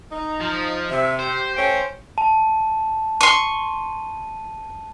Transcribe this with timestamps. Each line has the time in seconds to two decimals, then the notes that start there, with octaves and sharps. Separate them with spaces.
0.12 D#4 A#5
0.41 F3
0.90 C3 E5
1.20 G4 C5
1.57 A3 C#4 G5
2.18 A5
3.21 C6 C#6 D#7